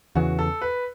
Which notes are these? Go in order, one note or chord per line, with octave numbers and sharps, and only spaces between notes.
E2 C#3 E3 F#4
A4
B4